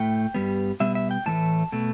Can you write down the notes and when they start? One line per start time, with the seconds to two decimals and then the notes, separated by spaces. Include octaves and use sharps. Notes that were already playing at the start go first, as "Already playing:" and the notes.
Already playing: A2 A3 G5
0.34 G2 G3 B3
0.80 B2 G3 B3 E5
0.95 E5
1.11 G5
1.26 A2 E3 A3 A5
1.72 B2 A3